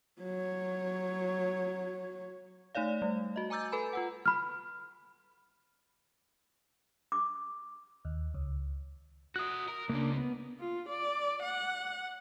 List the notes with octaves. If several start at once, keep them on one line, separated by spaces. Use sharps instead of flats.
F#3 C#5
A3 D#4 C#5 D5 F5
G3 A3
F#4 D#5
G#5 A#5 D6 E6 G6 A6
A4 B4 G#5 B5
F4 B4 F#5
B5 F6
D6
D#2
C#2
F#4 E5 D#6 F#6
A#4
C#2 C#3 A#3 D4
B3
F4
D5
F#5